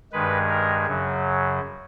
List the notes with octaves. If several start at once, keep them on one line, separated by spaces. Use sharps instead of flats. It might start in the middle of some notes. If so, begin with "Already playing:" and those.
G2 D#3 G#3 B4
A#4
F#2 C#3 F#3